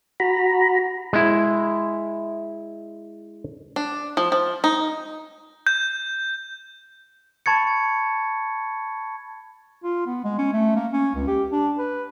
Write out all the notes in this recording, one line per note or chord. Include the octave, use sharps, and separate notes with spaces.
F#4 A#5 B5
G#3 E4
D4
F3
F3
D#4
G6
A5 B5 C#6 G#6 A6 C#7
F4
B3
G#3
C#4
A3
A#3
C#4
C#2
G4
D4
B4